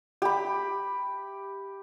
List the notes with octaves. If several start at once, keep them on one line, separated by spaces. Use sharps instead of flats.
G4 B5